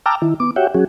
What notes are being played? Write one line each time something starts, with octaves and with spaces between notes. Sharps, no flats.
G5 A5 A#5 D6 E6 F6
D#3 E4
B3 D6
F#4 G4 C#5 E5 F#5 G5
F#3 C#4 F#4 G#4